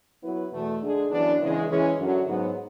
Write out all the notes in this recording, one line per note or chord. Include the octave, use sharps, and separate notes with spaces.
F#3 B3 E4 B4
E2 B2 A3
D3 G#3 D4 G#4
F#2 E3 B3 D4
E2 C#3 E3 G#3 C#4
E3 G#3 C#4
F#2 D3 F#3
G#2 F#3 B3